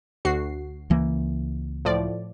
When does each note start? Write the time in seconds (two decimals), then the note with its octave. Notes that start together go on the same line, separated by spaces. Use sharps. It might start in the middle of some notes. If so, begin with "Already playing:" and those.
0.25 D2 F#4 C7
0.90 C#2 E3 A#3
1.85 A2 F3 D5